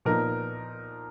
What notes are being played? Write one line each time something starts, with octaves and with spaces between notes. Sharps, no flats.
A#2 F3 B3 D#4 A#4